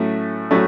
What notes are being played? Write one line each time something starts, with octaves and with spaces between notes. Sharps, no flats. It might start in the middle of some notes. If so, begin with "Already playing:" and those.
Already playing: A2 F#3 A3 C#4
A2 F#3 A3 C#4